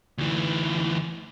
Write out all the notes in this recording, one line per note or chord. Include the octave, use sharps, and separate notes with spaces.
D2 E3